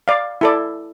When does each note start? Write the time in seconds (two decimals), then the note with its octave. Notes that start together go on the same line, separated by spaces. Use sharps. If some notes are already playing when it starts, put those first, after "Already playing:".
0.08 D5 F5
0.41 E4 A4 D5